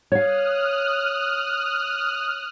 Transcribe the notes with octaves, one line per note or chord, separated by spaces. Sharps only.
C#5 F5 D#6 F6 F#6